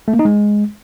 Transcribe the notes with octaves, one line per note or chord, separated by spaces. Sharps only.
A3
A#3
D#4
G#3